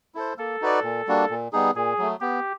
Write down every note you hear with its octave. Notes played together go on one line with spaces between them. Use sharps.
E4 A4 C5
A#3 A4
D#4 F#4 B4 D5
A#2
G3 A#3 D4 F#4
A#2
G3 B3 D#4 G#4
A#2 G#4
F#3 A3
B3 G4